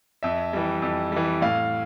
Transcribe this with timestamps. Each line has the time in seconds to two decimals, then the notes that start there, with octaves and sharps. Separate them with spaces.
0.23 F2 E5
0.53 E3 G3
0.82 F2
1.12 E3 G3
1.42 A2 F5